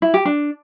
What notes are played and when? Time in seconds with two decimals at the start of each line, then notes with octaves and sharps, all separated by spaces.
0.02 E4
0.14 G4
0.25 D4